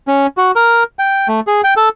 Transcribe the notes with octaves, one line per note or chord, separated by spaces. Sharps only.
C#4
F#4
A#4
G5
A3
G#4
G5
A4